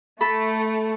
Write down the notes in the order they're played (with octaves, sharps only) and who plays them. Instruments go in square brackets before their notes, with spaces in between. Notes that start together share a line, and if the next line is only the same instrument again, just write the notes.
[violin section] A3 [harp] A4 B5